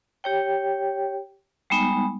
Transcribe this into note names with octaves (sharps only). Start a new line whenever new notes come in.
G4 C#5 G5
G3 G#3 B3 D#4